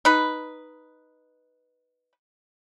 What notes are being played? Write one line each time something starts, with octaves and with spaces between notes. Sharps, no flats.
D#4 B4